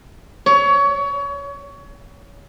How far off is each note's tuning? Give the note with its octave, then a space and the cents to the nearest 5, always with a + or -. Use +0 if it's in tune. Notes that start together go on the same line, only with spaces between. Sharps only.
C#5 +25